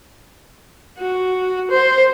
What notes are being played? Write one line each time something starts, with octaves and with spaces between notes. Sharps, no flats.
F#4
C5